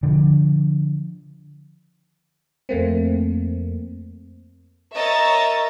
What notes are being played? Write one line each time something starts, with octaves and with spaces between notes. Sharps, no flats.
D3 F3
F2 A3 A#3 C4
A#4 C#5 D#5 E5 A#5 A6